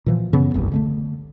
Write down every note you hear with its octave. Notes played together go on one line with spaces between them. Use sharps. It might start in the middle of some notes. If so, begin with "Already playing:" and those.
A#2 E3 F3
F#2 C#3 E3 B3
F1 C2 G2
D3 G#3 A3